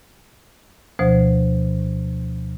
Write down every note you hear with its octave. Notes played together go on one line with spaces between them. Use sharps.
D2 B2 F3 C5